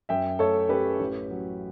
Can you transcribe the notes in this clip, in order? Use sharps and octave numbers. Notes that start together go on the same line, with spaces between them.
F#2 E5 G5
A3 A4 C#5
C#4 G4 B4
A1
F#3